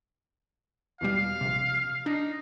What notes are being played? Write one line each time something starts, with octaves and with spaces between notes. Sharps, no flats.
E2 B2 G3 F5
A#1 C3
D4 D#4